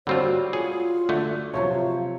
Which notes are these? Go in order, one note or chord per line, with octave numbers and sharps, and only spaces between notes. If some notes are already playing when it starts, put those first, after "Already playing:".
D3 G3 C4 F4 F#4 C#5
F4 G#4 C#5
D3 A3
C3 F3 F#3 C#5 F5